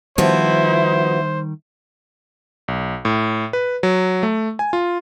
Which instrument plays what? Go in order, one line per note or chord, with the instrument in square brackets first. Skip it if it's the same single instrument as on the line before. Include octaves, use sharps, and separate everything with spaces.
[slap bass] D#3 G3 [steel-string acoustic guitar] F3 B3 F#4 [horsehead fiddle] E4 [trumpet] C5
[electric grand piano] B1
A2
B4
F#3
A3
G#5
F4